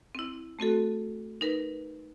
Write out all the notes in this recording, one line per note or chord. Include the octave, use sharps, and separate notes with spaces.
C4 E4
A3 C4 F#4 A4
D#4 A#4 B4